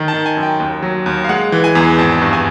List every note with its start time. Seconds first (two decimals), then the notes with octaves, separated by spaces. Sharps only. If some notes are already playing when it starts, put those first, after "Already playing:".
Already playing: D#3
0.08 A5
0.14 D#3
0.26 G#5
0.37 F#2
0.43 G5
0.60 D#2
0.82 F#3
1.06 D#2
1.24 F5
1.29 G#3 F#5
1.52 E3
1.64 G#5
1.75 E2
1.98 G#1 A5
2.22 G2
2.33 G#5